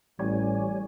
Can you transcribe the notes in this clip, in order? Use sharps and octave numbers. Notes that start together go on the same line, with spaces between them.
A1 G3 C#5 D5 G#5